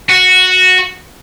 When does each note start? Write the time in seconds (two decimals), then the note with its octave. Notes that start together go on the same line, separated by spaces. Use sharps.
0.10 F#4